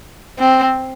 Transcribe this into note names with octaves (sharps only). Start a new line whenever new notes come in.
C4